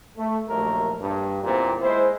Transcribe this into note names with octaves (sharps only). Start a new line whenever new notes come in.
A3
A#1 D#2 F#3 A3 A#4
G2
E2 A#2 C4
G#3 E4 C5